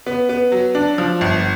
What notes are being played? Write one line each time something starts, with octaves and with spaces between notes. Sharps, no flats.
B3
B3
F#3
D4
F3
G1